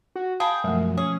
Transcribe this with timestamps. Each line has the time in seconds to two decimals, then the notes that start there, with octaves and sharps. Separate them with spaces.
0.16 F#4
0.40 G#4 F5 G5 A5 B5
0.64 F#2 B2 F3 G#3 A3
0.97 C#4 G#4